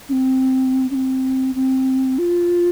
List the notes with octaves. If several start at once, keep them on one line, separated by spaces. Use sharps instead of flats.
C#4
C4
C#4
C4
C4
F4